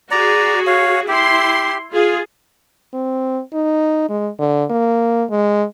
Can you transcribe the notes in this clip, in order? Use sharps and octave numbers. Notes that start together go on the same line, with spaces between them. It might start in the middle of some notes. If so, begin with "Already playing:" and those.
F#4 G#4 D5 A#5
C#5 F5
E4 G4 C6
F4 G#4
C4
D#4
G#3
D3
A#3
G#3